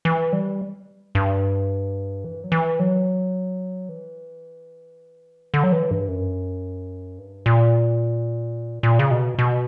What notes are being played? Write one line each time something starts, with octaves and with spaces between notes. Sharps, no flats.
E3
G3
G2
E3
F#3
E3
F#3
E3
D3
F#3
E3
G2
F#2
G2
A#2
A#2
C#3
B2
B2